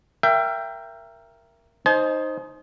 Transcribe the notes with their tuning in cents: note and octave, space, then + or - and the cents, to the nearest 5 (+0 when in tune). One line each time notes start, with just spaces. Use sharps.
A#4 +0 E5 +25 G5 +0
D#4 +0 C5 +10 G#5 +45